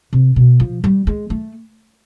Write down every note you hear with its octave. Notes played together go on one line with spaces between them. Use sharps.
C3
B2
F3
G3
G#3
A3